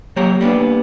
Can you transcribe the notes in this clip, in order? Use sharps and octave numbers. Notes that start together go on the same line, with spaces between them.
F#3 A#3 G4 C#5 A#5
G3 A#3 B3 D4